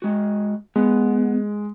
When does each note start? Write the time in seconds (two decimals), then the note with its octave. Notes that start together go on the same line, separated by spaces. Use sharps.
0.02 G#3 F#4
0.76 G#3 B3